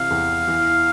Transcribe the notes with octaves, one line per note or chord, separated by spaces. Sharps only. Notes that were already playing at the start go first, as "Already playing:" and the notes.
Already playing: C3 E3 F5
E2
E3